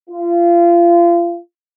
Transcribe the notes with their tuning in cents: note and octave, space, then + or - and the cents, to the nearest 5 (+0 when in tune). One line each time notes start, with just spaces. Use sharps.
F4 -30